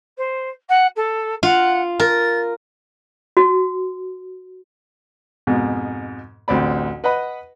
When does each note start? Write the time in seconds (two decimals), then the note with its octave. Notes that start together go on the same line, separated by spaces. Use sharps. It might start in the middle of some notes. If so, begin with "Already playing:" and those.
0.17 C5
0.69 F#5
0.96 A4
1.43 F4 F#5
2.00 A#4 A6
3.37 F#4
5.47 F2 G#2 B2
6.48 A1 D2 C4 D5 B5
7.04 B4 D#5 F#5 B5